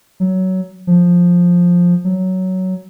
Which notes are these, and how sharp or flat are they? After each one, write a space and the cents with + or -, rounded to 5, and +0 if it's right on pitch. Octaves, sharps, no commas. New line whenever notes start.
F#3 +15
F3 +10
F#3 +10